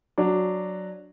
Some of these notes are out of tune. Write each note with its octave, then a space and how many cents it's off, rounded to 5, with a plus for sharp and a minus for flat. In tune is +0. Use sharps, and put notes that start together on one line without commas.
F#3 +0 D4 +0